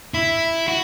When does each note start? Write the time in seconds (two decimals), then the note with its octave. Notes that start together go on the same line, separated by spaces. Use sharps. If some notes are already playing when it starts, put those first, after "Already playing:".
0.14 E4
0.68 F#4